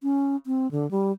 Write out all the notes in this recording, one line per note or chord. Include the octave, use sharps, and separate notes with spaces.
C#4
C4
D3
G3